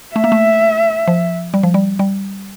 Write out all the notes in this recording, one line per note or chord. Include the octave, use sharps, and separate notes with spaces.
A3 E5
A#3
A3
F3
G3
F3
G3
G3